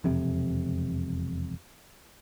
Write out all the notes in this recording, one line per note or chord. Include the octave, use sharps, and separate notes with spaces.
E1 F2 C3